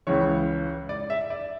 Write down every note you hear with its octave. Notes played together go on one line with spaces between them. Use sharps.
C#2 C#3 E3 C#5
D5
E5
D5